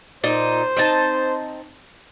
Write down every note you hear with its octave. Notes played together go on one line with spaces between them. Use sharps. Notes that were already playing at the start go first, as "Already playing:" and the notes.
A#2 D#4 C5
C4 D#4 A5